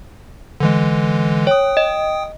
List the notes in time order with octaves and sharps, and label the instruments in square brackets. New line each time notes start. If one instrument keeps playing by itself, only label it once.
[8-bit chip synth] D3 E3 G#3
[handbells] C#5 [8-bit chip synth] G5 D#6
[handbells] D#5